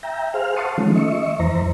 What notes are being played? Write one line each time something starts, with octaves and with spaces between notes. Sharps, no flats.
E5 G5 A#5
G#4 C5 F5 F6
F#5 A5 C6 C#6 D#6
D#3 F3 G#3 A3 C#4
D#5 E5 C#6
F2 E3 C5 A#5